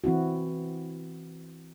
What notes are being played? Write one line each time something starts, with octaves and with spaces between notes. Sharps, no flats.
E3 C4 E4 F#4